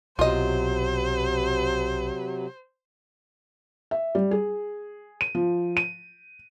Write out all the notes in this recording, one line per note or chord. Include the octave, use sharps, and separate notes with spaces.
B1 C3 F#3 F4 C5 D#5
E5
G3
G#4
D#7
F3
D#7